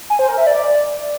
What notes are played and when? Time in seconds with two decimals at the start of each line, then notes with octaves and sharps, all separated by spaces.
0.10 G#5
0.19 C5
0.28 A#4
0.37 E5
0.47 D5